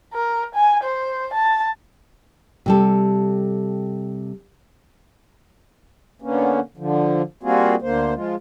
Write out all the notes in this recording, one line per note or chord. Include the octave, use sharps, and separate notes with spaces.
A#4
G#5
C5
A5
C3 G3 A4
D3 A#3 B3 C#4
D3 F3
G3 A#3 C4 F4 F#4 G#4
D2 D3 A#3 C5
F3 G#3 F4